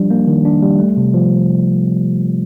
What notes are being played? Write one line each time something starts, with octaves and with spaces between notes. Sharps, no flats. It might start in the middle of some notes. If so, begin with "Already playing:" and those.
Already playing: F3 G3 D4
A#3
D#3
D4
G3
A3
C3
F3